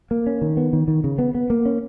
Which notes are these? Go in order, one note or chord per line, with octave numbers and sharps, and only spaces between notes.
A#3
C#4
D#3
B3
D#3
D#3
C#3
B3
B3
A#3
C#4